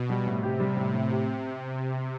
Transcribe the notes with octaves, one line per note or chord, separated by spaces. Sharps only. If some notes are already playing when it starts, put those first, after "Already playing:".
Already playing: B2
G3
A2 C3
G4
G3
A2
A2
G4